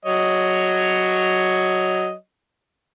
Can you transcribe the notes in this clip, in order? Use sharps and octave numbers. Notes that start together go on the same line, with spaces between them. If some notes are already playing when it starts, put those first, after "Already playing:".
F#3 C#5 D#5